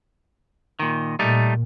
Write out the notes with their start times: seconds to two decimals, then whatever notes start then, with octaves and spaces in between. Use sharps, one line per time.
0.79 A#2 D#3
1.19 A#2 G3 A3 D#4